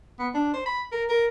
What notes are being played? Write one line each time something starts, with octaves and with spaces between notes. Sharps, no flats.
B3
D4
C5
B5
A#4
A#4